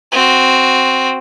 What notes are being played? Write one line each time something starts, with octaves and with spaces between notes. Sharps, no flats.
C4 F#4